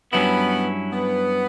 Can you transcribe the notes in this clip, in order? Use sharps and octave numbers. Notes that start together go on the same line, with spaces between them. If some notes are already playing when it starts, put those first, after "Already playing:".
G2 F#3 B3 C#4 E4
B3